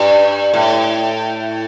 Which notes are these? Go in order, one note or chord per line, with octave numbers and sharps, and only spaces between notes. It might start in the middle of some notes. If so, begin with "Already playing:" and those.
Already playing: G2
A2